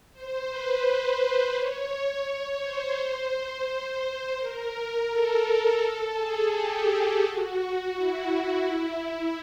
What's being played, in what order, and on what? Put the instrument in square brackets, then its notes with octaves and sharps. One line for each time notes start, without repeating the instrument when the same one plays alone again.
[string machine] C5
B4
C#5
C#5
C5
A#4
A4
A4
G#4
G4
F#4
E4
E4